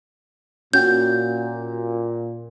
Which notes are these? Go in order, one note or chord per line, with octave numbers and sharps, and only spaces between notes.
A#2 C#4 F#4 G5 G6